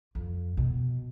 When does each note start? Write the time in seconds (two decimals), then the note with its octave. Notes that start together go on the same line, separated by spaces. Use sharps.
0.15 F2
0.57 B2